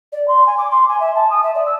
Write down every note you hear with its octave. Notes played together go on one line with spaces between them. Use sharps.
D5
C6
G#5
D6
C6
G#5
E5
A5
D#6
E5
D5
E6